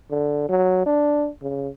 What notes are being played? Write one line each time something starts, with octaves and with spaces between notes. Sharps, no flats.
D3
F#3
D4
C#3